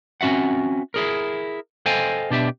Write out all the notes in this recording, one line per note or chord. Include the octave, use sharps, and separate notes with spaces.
C4 C#4 F#4 E5 F#5
E4 G#4 A#4
A4 C5 D#5 F5 G5 G#5
B2 D4 G4 E5